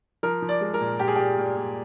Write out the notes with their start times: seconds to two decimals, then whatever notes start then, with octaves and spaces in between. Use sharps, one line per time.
0.23 F3 A#4
0.42 F3
0.49 D5
0.61 G#3
0.74 A#4
0.81 A#2
0.99 A#2 G4
1.08 G#4
1.16 A#2 G4
1.38 A#2
1.57 A#2